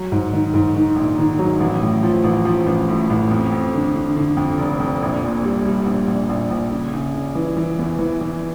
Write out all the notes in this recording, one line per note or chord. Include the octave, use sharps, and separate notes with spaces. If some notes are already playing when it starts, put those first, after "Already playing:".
Already playing: F#3
G#2
D#3
G#2
D#3
A#1
D#3
F#3
A1
A2
F3
A1
F3
A1
A2
A1
F2
F2
D3
D3
D3
F2
F1
F2
A#1
A#2
G3
G3
A#1
A#1
A#1
A#1
C#3
C#3
C#3
E3
E3
E2
E3
E3